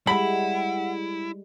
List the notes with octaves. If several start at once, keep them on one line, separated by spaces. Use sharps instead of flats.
G3 G#3 E4 F#5 B5